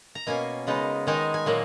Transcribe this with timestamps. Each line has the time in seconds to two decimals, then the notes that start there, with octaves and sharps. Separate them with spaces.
0.15 A#5
0.27 B2 A#3 C#4 G#5
0.67 C#3 G#3 B3 D#4
1.07 D#3 G#3 D#4 G#5
1.34 G#5
1.46 A#2 F#3 A#3